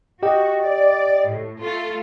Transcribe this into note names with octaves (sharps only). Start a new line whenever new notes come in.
F#4 G4 D#5 G5
D5
A2
A3 F4 A4